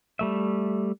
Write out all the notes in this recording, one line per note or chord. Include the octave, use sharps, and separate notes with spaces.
G3 A3 E5